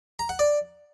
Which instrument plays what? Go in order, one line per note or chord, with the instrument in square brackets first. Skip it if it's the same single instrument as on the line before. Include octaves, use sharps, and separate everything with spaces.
[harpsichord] A#5
F#5
D5